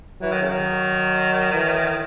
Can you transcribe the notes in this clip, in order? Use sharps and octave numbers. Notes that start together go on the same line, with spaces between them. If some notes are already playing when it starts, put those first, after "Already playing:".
E3 F#3
D#3
C#3
D#3
E3